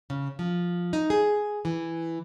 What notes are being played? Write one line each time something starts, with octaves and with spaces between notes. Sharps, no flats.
C#3
F3
D#4
G#4
E3